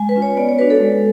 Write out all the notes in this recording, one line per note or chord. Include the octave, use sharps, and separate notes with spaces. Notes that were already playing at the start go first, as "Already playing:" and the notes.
Already playing: G#3 G#5
B4
C#4 F4
C#5
B3 D5
C#5
D4 F#4 B4
A4
G#3